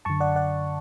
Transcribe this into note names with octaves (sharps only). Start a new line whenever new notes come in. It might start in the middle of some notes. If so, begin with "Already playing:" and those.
F#2 D3 A5 C#6
D5 F#5
D5 F#5